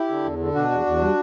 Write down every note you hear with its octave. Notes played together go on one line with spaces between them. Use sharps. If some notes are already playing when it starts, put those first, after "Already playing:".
Already playing: E4 G4
D3
E2
D3
B2 D4 F#4
E2
E2
G3